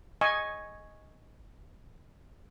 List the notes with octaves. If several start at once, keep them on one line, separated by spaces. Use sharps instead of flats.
D#5 G#5 C#6